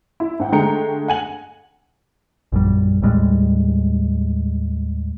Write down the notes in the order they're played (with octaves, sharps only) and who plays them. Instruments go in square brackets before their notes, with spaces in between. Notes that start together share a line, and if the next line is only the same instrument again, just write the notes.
[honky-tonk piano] E4
G#2 F#5 G5
D3 G#3 A3 G5 A#5 C#7
F#5 G#5 F#7
[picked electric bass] A#1 F#2 G3
D#2 A2 G3 G#3